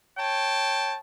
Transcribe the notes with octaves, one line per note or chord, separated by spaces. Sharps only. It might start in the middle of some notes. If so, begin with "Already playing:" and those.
C#5 G5 A5